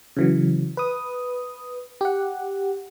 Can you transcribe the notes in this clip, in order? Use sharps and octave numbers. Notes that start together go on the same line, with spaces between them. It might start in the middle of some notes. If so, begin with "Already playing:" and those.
C#3 E3 F#3
B4 D#6
G4 F#5